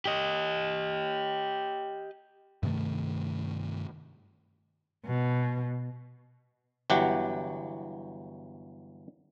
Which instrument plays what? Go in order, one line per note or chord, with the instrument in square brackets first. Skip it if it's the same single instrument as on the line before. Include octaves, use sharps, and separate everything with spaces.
[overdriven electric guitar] G4 D#5
[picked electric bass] G2 C3 D#3 A3
[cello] B2
[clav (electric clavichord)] G1 E3 F#3 G4 F#5